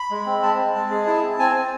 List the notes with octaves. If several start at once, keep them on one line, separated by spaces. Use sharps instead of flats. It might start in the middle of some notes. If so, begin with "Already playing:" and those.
Already playing: B5
G#3
C4
G#3 A5
C4
G#3
G#4
E4
C4
C4 G#5
C4